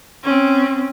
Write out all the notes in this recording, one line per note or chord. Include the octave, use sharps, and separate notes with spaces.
C4 C#4